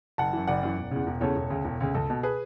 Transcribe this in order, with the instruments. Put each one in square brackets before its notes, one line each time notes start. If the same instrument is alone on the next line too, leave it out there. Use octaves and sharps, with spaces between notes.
[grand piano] F#1 F#5 A5
F#2 E3
F#1 D5 F#5
F#2 E3
E1
E2 C#3
E1
E2 C#3 A4 C#5
E1
D2 C#3
E1
D2 C#3
C#2 A4
B2
G#4 B4